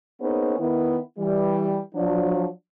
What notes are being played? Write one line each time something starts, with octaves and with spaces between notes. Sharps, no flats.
A#3 B3 C#4 D#4 G#4 C5
D#3 B3 E4
E3 G3
F3 F#3 D4